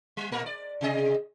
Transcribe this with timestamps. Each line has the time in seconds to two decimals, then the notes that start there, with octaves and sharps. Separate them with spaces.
0.17 G3
0.32 A#2 A#3 A#4
0.46 D5
0.81 C3 G#4 D#5